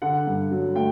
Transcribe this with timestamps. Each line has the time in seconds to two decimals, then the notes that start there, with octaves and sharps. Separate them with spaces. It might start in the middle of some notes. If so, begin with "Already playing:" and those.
0.02 D3 F#5
0.27 G2
0.51 F#3
0.75 A3 G5